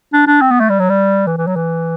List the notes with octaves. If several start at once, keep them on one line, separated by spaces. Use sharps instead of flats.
D4
D4
C4
B3
A3
G3
F#3
G3
E3
E3
F#3
E3